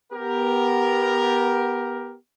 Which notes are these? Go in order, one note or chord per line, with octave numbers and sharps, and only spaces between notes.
B3 G4 A#4